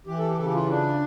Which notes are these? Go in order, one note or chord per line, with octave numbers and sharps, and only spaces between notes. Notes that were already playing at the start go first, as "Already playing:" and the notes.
E3 G4
A4
G4
C#3 A4
G4
F4
D4